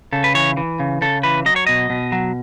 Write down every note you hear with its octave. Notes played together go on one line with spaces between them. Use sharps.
C#3 A4
B4
E3 C#5
E3
C#3
C#3 A4
E3 B4
F#3 D#5
C#5
B2 D#5
B2
F#3